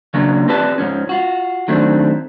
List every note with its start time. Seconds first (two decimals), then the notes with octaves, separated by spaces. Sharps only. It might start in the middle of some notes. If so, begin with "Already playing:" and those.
0.14 C#3 F#3 A#3 C#4 D4
0.48 C4 F4 G4 B4 D5 A5
0.78 G#2 F3 C#4
1.09 F4 F#4
1.68 D#3 F#3 A3 C4 D4